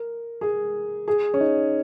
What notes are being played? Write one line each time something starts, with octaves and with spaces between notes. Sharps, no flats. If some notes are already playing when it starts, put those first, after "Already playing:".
Already playing: A#4
G#4
G#4
C#4
D#4